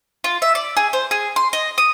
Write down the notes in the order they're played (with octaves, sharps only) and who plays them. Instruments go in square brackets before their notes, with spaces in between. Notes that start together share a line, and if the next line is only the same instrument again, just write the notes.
[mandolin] F4
E5
D5
G#4
C5
G#4
C6
D#5
D#6